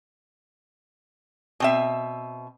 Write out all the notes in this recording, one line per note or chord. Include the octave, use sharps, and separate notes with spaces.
B2 C4 E5